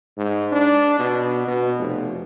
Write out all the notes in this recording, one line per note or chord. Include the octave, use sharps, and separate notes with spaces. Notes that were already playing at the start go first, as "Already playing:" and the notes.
G#2
D4
B2
B2
F1